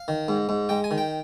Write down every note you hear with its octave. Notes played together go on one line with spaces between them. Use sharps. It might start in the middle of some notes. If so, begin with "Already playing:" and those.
Already playing: F5
D#3
G#2
G#2
G#3 G5
G#5
D#3
G5